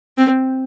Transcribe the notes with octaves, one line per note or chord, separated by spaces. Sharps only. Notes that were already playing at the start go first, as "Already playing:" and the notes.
C4